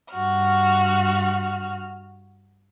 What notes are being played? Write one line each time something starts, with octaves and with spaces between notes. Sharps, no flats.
G2 F#4 F6